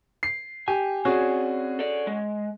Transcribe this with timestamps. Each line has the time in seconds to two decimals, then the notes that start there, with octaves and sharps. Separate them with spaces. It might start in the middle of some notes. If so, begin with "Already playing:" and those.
0.23 C7
0.68 G4 G#5
1.05 C4 C#4 F#4 G#4 B4 D5
1.79 A4 D5
2.07 G#3